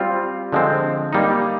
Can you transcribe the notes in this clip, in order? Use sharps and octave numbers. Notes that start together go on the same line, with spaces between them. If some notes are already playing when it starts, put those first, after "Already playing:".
Already playing: G3 C4 F4
D3 F3 G#3 C4
G3 A#3 D#4